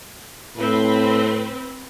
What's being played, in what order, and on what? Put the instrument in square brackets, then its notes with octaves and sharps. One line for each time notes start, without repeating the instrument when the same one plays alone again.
[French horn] A2 [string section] C4 B4